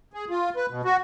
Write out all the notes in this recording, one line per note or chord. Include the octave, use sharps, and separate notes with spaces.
G#4
F4
B4
B2
F#4